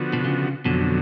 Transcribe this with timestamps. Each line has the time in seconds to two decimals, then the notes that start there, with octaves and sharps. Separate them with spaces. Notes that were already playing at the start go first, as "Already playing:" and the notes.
Already playing: D3 F3 B3 F#4
0.13 B2
0.25 C#3
0.65 F2 B2 D3 F#3